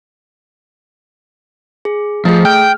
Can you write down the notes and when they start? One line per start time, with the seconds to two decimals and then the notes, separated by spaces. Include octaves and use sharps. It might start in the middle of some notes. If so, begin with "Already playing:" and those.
1.85 G#4
2.25 F3 A3 G#4
2.45 G5 F6